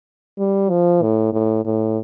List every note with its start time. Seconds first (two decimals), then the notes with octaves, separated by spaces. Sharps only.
0.39 G3
0.70 F3
1.02 A2
1.33 A2
1.65 A2